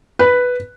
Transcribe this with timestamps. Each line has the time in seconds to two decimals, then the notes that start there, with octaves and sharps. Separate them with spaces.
0.19 B4